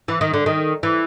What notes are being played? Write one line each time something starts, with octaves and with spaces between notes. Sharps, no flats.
E3
D#3
D3
D#3
E3